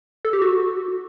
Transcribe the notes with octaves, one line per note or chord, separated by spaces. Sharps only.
A4
G4
F#4